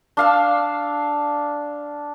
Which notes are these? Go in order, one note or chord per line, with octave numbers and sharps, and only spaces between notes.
D4 F5 E6